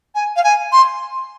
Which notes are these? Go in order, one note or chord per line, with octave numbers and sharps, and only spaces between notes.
G#5
F5
G#5
C6